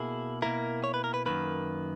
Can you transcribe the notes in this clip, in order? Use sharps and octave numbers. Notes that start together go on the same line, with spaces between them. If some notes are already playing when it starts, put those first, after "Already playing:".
Already playing: B2 A#3 E4 G#4
B2 A#3 E4 A#4
C#5
B4
A#4
B4
F#2 D#3 A#3 B4